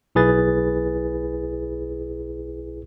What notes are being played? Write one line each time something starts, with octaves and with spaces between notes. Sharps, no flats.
B1 E4 G#4 B4 A6